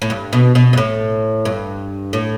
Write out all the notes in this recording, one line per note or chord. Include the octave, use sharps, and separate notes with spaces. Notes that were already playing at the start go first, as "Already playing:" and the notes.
A2
G2
B2
B2
G2
A2
G2
A2